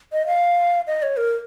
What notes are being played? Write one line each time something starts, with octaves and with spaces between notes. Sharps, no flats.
D#5
F5
D#5
C#5
A#4